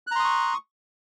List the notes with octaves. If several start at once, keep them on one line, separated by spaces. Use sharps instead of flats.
A#5 C6 C#6 D#6 F#6